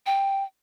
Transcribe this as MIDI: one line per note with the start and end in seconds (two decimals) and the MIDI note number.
0.06 0.43 79